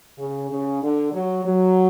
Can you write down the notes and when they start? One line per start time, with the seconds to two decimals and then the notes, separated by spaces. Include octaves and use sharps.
0.18 C#3
0.50 C#3
0.82 D3
1.12 F#3
1.45 F#3